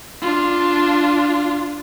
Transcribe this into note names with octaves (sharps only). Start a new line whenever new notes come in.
D4 F4